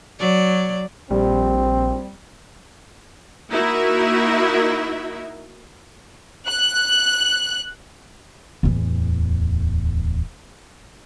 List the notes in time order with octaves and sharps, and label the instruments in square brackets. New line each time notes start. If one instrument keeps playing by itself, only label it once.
[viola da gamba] F#3 D5
[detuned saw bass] A#1 [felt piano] G3 [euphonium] C4
[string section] A#3 D#4 E4 F#4 A#4 E5
[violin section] F#6
[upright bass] D1 E2